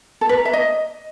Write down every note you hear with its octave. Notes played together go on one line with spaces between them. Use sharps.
A4
B4
A#5
E5
D#5